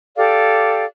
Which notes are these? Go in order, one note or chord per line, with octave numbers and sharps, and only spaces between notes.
G4 A4 D5 F5